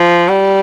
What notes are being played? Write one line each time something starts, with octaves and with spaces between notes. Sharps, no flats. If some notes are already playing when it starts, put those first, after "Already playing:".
Already playing: F3
G3